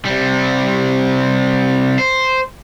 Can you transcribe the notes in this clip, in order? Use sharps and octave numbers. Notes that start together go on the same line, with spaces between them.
C3 G3
C5